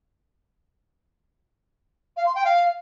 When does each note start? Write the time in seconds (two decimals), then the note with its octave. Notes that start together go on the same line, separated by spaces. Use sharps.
2.17 F5
2.26 C6
2.35 G5
2.44 F5